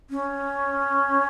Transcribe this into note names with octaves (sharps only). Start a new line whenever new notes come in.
C#4